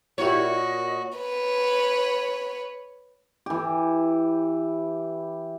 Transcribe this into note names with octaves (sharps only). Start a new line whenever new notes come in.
A#2 E4 F#4 G4 A#4 C#5
D#5
B4 C#5
E3 G4